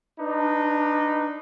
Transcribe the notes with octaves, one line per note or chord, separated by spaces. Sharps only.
D4 D#4 B4